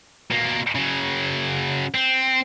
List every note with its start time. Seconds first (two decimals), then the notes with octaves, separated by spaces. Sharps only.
0.31 B2 A#3
0.75 C#3 F#3
1.94 C4